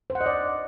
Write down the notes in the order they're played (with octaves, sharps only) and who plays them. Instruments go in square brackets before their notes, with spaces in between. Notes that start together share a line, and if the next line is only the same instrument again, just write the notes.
[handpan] C5
F#5
D#5
D5